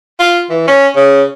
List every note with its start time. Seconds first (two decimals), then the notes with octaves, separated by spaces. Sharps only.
0.19 F4
0.50 E3
0.68 C#4
0.96 C#3